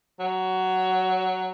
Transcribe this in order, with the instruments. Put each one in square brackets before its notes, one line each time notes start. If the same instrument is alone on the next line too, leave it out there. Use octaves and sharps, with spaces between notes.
[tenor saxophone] F#3